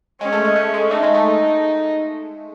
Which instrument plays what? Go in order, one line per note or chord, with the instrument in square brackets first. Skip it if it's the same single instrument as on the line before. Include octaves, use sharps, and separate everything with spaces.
[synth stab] G#3 [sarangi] C#4
[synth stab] A3
G#3
A3
G#3
[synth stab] A3 [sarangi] D#4
[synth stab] G#3
A3